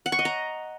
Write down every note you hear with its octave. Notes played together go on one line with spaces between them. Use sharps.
F#5
C#6
D#5
A#5